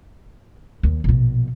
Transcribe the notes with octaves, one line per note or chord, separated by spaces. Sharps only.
D#2
A#1 B2